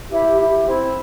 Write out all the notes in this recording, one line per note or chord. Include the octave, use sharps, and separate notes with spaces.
E4 G4
E4 G4
C4 E4